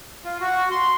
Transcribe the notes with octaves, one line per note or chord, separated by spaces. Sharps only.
F4
F#4
C6